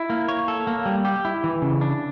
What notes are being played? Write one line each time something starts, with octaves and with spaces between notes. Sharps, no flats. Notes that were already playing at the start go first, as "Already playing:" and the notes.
Already playing: E4
A#3
C#5
A4
A#3
G3
G4
E4
E3
C#3
D4